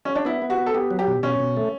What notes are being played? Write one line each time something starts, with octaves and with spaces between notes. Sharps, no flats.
C#4
D4
B3 E4
B3
F#4
B3
A4
B3 G4
F#3
G4
B2
B2 C#4
B2
A3